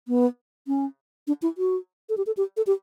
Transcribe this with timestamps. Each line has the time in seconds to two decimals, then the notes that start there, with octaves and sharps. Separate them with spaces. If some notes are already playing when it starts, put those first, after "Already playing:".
0.08 B3
0.67 C#4
1.27 D4
1.42 E4
1.58 F#4
2.09 A4
2.17 G4
2.27 A4
2.37 G4
2.57 A4
2.67 G4